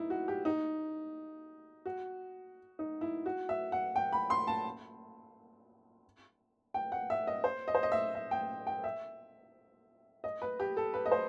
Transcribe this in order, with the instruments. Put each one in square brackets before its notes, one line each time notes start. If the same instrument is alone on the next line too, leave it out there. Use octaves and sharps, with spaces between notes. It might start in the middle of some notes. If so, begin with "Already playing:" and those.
Already playing: [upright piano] D#4 E4
F#4
G4
D#4
F#4
D#4
E4
F#4
E5
F#5
G5
B5
C6
A5
G5
F#5
E5
D#5
C5
D#5
C5
D#5
E5
E5
G5
G5
E5
D#5
B4
G4
A4
B4
D#5
C5